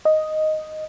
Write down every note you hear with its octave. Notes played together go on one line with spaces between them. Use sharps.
D#5